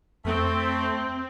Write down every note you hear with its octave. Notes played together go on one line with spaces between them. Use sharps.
F2 A3 C4